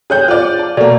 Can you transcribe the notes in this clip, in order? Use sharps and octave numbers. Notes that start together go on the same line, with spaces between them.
D4 G#4 C#5 G5 F#6 G6
F4 C5 D5
G#4
A5
B2 A#3 D5